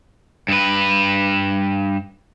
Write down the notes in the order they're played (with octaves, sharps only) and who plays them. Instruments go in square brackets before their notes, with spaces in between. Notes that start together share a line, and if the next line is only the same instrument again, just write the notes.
[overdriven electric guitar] G2 B4